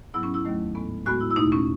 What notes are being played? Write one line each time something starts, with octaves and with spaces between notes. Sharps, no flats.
G#2 F#3 B3 E4
C#4
E4
D#2 D#3 F#3 A3
A2 G#3 B3
A2 G#3 B3 F#4
E4
E4
E2 B2 A3 D#4
C#4